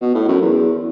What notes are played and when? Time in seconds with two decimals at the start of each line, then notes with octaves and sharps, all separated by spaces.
0.02 B2
0.15 A2
0.28 F#2
0.42 E2